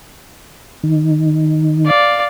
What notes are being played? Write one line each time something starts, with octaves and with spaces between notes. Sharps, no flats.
D#3
D5 F5